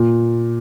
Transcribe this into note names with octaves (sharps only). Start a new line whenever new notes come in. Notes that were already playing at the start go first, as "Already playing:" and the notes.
Already playing: A#2